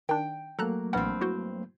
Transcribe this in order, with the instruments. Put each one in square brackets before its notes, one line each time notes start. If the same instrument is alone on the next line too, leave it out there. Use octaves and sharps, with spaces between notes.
[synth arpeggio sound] D#3 D4 [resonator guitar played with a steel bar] G5
[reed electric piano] F#3 A3 A#3 [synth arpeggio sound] A4 A#5 F#6
[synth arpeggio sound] A#1 E3 F#5 [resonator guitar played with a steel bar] G2 C4
[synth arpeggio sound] E4 F#4 C5